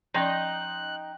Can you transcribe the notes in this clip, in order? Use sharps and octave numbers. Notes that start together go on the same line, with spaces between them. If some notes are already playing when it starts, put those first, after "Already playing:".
F3 C#4 D#4 D5 D#5 G5 C6 F#6